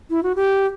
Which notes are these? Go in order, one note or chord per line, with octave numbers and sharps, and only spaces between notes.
E4
F#4
G4